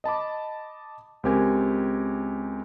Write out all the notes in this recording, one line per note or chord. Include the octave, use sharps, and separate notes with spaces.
D#5 A5 B5 D6
C#2 C4 G4 A#4 G#5 G#6